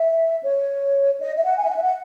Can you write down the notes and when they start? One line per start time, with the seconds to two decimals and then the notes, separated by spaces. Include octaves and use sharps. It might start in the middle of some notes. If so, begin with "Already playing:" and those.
Already playing: E5
0.43 C#5
1.20 D#5
1.37 E5
1.45 F#5
1.57 G#5
1.66 E5
1.70 F#5
1.77 E5
1.83 F#5